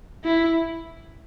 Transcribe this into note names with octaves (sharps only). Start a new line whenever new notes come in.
E4